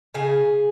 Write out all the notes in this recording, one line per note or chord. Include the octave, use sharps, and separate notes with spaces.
C#3 G#4